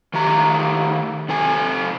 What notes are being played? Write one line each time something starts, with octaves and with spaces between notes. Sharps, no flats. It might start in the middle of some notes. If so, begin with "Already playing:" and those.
D#3 A3 G4 A#5
C3 A4 G#5